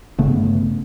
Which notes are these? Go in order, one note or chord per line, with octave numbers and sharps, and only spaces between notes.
G1 C#3 A3 B3